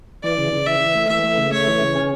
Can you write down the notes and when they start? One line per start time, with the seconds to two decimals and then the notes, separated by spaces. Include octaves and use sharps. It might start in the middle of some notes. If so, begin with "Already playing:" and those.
0.24 E3 D5
0.38 C#3
0.52 C#3
0.66 E3 E5
0.80 E3
0.95 A3
1.09 E3 E5
1.23 A3
1.38 C#3
1.52 A3 C#5
1.67 E3
1.81 C#3
1.96 C#4